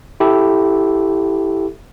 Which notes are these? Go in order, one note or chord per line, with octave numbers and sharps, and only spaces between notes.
E4 G4 A4